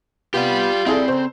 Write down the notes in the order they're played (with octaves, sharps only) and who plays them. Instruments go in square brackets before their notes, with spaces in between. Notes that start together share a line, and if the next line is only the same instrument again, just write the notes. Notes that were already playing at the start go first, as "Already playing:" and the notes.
[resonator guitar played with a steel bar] C3 B3 B4 [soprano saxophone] F4 [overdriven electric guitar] G4 D5
[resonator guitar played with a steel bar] G3 [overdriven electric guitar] C4 [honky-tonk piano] E4 G#4 A4
[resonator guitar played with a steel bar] C#3 A4 [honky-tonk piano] C5